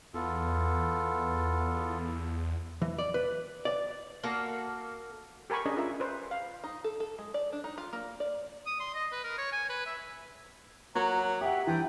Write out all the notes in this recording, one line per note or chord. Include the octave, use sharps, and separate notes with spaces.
E2 B3 F4 A4
E3
D5
B4
D5
A#3 F#4 A4
G4 A#4 G#5 B5 C#6
C#4 D4 G#4 A#4 D#5
F4 A#4 E5
B4 C5
F5
D#4
A4
A4
G#3
D5
D4
D#4
F4
A#3
D5
D#6
C6
D#5
B4
A#4
C#5
G#5
B4
E5
F#3 A#3 A#5
G4 E5 F#5
G2 E3 G5